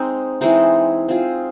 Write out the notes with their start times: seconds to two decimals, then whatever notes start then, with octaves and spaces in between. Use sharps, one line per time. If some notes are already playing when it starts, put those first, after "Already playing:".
Already playing: G#3 C4 D#4
0.41 E3 G#3 C4 D#4
1.08 C4 F4 G#4